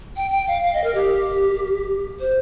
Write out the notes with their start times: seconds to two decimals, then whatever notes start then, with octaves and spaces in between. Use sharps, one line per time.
0.16 G5
0.31 G5
0.47 F5
0.63 F5
0.74 D#5
0.84 A#4
0.95 G4
2.20 C5